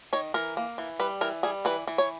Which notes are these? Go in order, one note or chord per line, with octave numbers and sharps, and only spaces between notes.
D#3 C#5
E3 A#4
A#3
E3
G3 B4
E3 A#4
G3 G#4
E3 B4
E3
C#5